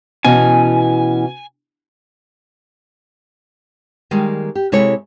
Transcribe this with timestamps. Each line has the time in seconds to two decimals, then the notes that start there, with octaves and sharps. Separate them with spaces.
0.25 B2 E3 C#4 G#5
4.11 D#3 G3 G#3 A#3
4.55 G4
4.72 C3 G#3 E4 A4 C#5